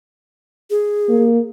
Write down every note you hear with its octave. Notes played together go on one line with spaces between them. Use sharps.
G#4
A#3